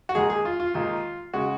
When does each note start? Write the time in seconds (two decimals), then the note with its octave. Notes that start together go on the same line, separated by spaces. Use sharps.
0.09 F#4
0.15 D#2 D#3 G#3 G#4
0.30 G#4
0.45 F4
0.60 F4
0.74 D#2 D#3 G#3 F4
1.34 C#3 G#3 F#4